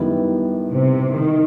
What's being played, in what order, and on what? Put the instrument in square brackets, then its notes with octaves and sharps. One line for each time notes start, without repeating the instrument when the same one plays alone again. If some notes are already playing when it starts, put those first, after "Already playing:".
Already playing: [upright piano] F#2 D#3 G3 B3 E4
[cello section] C3
D#3